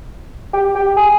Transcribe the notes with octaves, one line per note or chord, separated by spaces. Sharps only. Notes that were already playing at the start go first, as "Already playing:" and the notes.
G4
G4
G#4